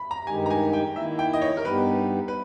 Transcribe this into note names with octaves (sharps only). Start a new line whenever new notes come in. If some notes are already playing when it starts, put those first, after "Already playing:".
Already playing: B5
A#5
G2 D#3 G#3 D#4 G4 G#5
A#5
G#5
G5
D#3 A#3 E4 E5
G5
D#5
C#5
A#4
G2 G3 B3 D#4 G4 B4
B4